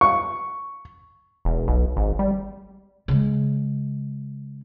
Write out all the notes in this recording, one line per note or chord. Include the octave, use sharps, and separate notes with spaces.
C#6
E1
B1
G#1
G3
C#3 G#3